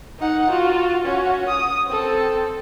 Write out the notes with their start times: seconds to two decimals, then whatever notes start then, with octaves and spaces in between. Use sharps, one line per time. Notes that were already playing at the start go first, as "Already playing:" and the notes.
0.19 D#4 F#5
0.49 F4 F#4
1.05 C#4 F#4
1.49 D#6
1.87 C4 A4